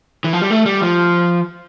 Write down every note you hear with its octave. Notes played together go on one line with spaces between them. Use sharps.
E3
F3
G3
A3
G3
F3